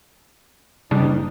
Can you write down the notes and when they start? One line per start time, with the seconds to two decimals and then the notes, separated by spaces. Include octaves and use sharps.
0.91 F#1 C#3 G3 D4 D#4